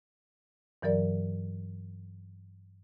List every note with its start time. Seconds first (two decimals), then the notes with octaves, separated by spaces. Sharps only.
0.82 G2 E3 F#3 A#4 D5